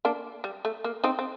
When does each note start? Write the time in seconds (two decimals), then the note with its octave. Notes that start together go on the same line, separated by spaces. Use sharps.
0.05 A#3 D4
0.44 G3
0.65 A3
0.84 A#3
1.04 C4 D#4
1.19 C4